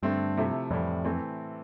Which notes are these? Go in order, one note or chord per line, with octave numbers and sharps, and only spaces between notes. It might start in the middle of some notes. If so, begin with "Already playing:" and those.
G2 D3 A3 C4
C3 F3 A3 E4
F2 A2 E3 G3
E3 A3 C4